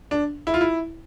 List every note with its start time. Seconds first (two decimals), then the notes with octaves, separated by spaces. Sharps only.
0.11 D4
0.47 E4
0.54 F4
0.61 E4